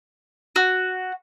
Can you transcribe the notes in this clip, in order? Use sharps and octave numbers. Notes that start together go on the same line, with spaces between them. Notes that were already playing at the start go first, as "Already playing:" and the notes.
F#4